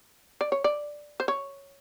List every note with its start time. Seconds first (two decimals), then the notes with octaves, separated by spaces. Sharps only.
0.41 D5
0.52 C#5
0.64 D5
1.20 C5
1.28 C#5